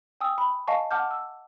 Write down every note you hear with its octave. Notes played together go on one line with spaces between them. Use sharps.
G5 G#5 D#6 E6
B5
D#5 F5 G#5 A5 C#6
F#5 A5 D6 F6 G6
E6